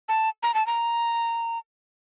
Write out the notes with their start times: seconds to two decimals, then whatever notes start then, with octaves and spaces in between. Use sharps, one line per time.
0.09 A5
0.43 A#5
0.54 A5
0.66 A#5